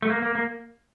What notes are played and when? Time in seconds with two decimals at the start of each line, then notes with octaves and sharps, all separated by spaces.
0.02 A3
0.10 A#3
0.22 A#3
0.35 A#3